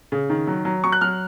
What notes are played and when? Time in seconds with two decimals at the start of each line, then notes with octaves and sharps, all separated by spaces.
0.12 C#3
0.30 D#3
0.47 F#3
0.65 F#3
0.84 F#3 C#6
0.92 F#6
1.01 F#3 F6